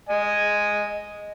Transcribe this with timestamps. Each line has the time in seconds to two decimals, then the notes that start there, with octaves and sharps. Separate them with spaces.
0.09 D#5 G#5